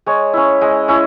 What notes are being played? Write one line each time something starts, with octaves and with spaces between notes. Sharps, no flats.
G#3 C#5
C#4 E4
G#3
C#4 E4